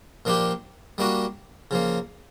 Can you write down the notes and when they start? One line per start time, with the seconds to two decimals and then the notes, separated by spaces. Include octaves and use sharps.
0.25 A#2 F3 A#3 D4 G4
0.98 G3 A#3 D4 F#4
1.71 C#3 F3 A#3